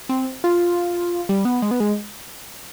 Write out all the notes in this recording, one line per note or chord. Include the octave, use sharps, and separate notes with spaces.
C4
F4
G3
B3
G#3
B3
G#3